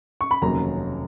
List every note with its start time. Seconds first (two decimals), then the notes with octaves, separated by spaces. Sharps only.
0.21 C#6
0.31 B5
0.42 F1 D#2 C#3 F#3 C#4 A#5